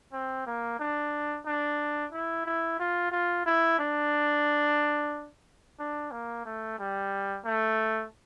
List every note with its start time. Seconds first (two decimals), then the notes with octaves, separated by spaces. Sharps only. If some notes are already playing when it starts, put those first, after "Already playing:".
0.12 C4
0.46 A#3
0.79 D4
1.46 D4
2.12 E4
2.46 E4
2.79 F4
3.12 F4
3.46 E4
3.79 D4
5.79 D4
6.12 A#3
6.45 A3
6.79 G3
7.45 A3